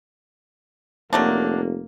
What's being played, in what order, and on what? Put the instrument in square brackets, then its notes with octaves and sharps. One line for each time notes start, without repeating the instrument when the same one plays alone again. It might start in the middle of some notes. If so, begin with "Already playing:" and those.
[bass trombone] F1 [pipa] F#3 A3 D4 [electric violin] A#3